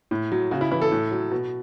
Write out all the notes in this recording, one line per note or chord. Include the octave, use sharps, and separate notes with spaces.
A2
F#3
C#3 F#4
E4
E3 E4
A4
A2
F#3
B2